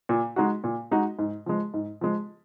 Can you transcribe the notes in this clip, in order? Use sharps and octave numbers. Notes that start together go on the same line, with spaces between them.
A#2
G#3 D#4 F#4
A#2
G#3 D#4 F#4
G#2
F3 G#3
G#2
F3 G#3